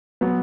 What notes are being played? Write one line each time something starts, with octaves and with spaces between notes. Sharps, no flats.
F#3 B3